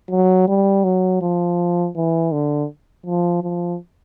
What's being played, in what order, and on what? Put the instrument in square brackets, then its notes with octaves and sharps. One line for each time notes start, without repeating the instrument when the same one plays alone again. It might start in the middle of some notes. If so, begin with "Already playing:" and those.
[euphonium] F#3
G3
F#3
F3
E3
D3
F3
F3